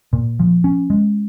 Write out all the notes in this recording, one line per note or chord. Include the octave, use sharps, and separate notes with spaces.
A#2
F3
C#4
G#3